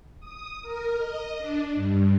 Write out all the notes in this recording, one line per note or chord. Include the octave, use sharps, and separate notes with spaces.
D#6
A#4
D#5
D4
G2